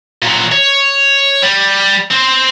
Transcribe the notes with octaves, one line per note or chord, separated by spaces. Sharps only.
A#2 F#3
C#5
G3
C4 C5